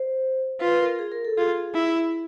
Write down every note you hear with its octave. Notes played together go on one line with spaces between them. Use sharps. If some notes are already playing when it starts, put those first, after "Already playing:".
Already playing: C5
F4 B4
A#4
G#4
A#4
A4
F4 G#4
E4